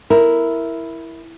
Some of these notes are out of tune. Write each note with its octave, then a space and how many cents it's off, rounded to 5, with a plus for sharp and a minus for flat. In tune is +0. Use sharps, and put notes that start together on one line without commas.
E4 +0 A#4 +0